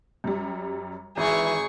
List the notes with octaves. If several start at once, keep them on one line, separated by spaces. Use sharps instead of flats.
F#2 G3
G#1 E3 G#4 C#6